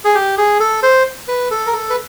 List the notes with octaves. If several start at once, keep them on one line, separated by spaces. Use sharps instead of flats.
G#4
G4
G#4
A4
C5
B4
A4
A#4
A4
B4